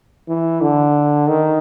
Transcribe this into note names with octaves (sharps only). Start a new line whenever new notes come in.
E3
D3
D#3